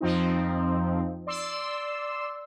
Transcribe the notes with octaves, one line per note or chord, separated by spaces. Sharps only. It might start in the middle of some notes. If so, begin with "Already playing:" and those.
F2 F3 C4 D#4
D5 C6 E6